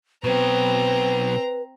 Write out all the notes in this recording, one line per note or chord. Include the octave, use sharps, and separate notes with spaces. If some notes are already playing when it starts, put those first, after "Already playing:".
B2 F#3 C4 B4 A#5